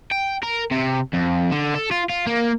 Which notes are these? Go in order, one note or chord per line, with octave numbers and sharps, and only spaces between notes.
G5
A#4
C3
F2
D3
A4
F4
F4
A#3